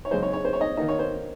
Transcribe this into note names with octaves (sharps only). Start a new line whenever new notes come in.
C#5
F#2 C#3 G#3 D#4 C5
C#5
C#5
C5
C#5
D#5
D#3 A#3 D#4 D#5
C#5
C5